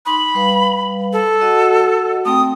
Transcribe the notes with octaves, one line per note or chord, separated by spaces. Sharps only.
D#4 B5 C6 D#6
G3 B4 F5
A4
F#4 D#5 F#5
A3 C4 G5 D#6